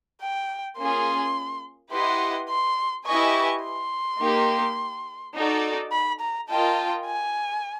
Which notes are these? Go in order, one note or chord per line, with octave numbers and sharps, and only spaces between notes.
G5
A#3 C#4 F4 G#4 C6
E4 G4 B4 D#5 F#5 C6
C6
E4 G4 B4 D#5 G#5 C#6
C6
A#3 D#4 G4
D#4 F#4 A4 D5
B5
A#5
F4 A#4 D#5 G5 A5
G#5